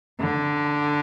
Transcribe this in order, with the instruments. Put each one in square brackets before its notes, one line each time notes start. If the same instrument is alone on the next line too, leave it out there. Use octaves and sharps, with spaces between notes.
[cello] D3